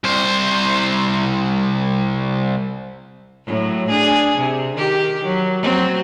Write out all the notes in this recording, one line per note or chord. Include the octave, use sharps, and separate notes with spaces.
C2 C5
A2 F#3
D4 G#4
C3
D#3 G4
F#3
F#3 C4